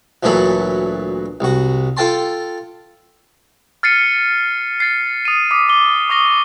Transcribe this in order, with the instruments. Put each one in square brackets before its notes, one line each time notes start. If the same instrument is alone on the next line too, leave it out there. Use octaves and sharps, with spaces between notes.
[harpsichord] D2 A#2 E3 F#3 A4 B5
C2 F#4
F4 A4 G5 A5 C6
[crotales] F6 A6 C7 C#7 D#7
A6 C7
D#6 D#7
D6 D#6 B6
D6 G7
C#6 D#6 A#6 G7